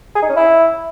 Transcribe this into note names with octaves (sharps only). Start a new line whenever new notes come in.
G#4
D#4
C#4
E4